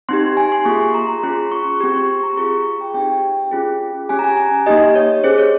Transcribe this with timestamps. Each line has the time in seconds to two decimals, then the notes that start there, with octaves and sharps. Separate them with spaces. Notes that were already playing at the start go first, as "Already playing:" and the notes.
0.09 C4 D#4 G4 C6
0.37 G#5
0.52 C6
0.65 A#3 F4 G#4 C#6
0.80 C6
0.94 A#5
1.08 A#5
1.23 C#4 F4 G#4 C6
1.52 C#6
1.80 C4 G4 C#6
1.95 C6
2.09 C#6
2.23 A#5
2.37 C4 F4 G#4 C#6
2.81 G5
2.94 C4 D#4 G4 G5
3.51 C#4 F4 G#4
4.09 C#4 G4 G#5
4.19 A#5
4.24 G#5
4.37 G#5
4.66 A#3 D#4 G4 D#5
4.95 C#5
5.24 C#4 G#4 C5
5.38 C#5